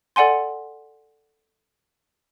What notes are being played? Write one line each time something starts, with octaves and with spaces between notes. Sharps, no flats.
A4 D5 F#5 G#5 C6